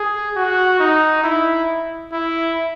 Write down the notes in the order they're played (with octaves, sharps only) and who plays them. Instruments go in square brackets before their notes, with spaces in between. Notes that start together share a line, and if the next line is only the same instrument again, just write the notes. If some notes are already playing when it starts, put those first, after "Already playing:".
Already playing: [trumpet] G#4
F#4
D#4
E4
E4